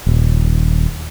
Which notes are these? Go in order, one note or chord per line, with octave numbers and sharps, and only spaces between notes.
D#1